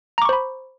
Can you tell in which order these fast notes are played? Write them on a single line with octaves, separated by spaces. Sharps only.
A#5 D6 C#6 C5 B5